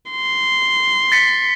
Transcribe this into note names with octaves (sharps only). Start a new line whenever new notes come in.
C6
A6 B6 C#7